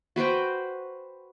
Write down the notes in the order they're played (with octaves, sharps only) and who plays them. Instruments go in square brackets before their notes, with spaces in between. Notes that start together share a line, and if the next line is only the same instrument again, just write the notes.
[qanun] F#4 B4 C5 G5